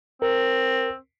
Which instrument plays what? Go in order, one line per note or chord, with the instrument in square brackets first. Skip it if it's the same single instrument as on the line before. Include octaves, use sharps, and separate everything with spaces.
[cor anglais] C4 [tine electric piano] A#4